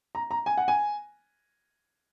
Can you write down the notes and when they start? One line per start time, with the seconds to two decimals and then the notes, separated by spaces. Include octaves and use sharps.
0.15 A#5
0.31 A#5
0.46 G#5
0.57 F#5
0.68 G#5